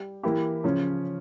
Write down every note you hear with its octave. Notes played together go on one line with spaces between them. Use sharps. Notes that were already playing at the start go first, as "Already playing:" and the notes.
Already playing: G3 G4
E3 A#3 E4 G4
C#3 F3 C#4